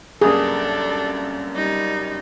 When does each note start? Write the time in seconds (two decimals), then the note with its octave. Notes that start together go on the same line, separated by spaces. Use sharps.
0.21 C2 F#2 A#3 D4 G#4 A4
1.55 G3 D#4